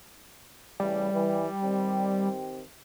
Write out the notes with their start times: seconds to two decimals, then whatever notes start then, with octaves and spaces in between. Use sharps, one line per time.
0.80 C#3 E3 G3 A3
1.13 E3
1.62 D#3 C4 G4